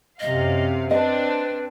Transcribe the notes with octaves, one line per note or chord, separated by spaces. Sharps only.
F#2 C3 D#5 F5
C4 D4 B4 D#5